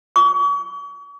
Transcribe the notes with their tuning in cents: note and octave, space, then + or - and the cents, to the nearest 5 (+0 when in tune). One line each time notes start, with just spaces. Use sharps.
C#6 +45